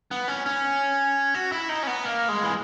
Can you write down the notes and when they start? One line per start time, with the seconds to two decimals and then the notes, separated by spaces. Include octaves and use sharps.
0.11 B3
0.28 C#4
0.46 C#4
1.34 F#4
1.52 E4
1.69 D#4
1.83 C#4
1.87 B3
2.05 A#3
2.29 G#3
2.43 E3